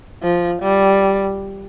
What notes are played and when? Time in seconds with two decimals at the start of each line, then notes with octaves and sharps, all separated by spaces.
0.23 F3
0.63 G3